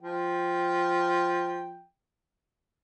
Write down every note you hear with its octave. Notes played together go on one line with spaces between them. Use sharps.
F3 G5